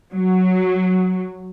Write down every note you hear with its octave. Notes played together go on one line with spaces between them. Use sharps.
F#3